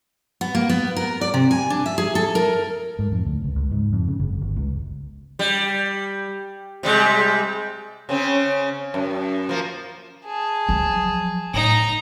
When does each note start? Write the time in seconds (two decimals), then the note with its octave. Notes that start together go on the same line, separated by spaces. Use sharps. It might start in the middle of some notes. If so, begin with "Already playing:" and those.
0.41 B3
0.55 A#3
0.69 B3
0.96 A#4
1.21 D5
1.34 C3
1.51 G#5
1.70 D4
1.86 E5
1.98 G#4
2.15 A4
2.35 A#4
2.99 G#2
3.12 F2
3.25 D2
3.44 C#2
3.56 C#2
3.72 G#2
3.93 F2
4.08 C#3
4.20 F#1
4.41 G1
4.56 C#2
5.39 G3
6.83 C3 G3 G#3
8.09 C#3 C4 C#4
8.94 F#2
9.49 F3 A#3
10.26 G#4 A5
10.69 F3 F#3
11.54 A2 D#4 A#5